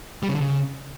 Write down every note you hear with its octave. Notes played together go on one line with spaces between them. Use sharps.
G3
C#3
D3
C#3